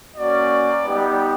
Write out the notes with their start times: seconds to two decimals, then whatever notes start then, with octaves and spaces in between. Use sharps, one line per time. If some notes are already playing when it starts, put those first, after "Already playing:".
0.17 A#3 C#4 F#4 D5
0.83 G3 B3 D#4 G4